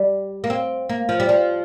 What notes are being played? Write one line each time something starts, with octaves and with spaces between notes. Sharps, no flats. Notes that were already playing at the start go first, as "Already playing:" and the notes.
Already playing: G3
A#3
C4
A#3
F3
G3
F3